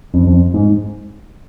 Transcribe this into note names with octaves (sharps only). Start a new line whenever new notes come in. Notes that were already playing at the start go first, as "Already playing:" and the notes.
F2
F2
G#2